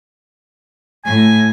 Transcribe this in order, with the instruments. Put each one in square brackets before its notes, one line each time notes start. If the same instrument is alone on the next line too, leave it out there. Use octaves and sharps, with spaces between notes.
[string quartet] A2 [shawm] G#5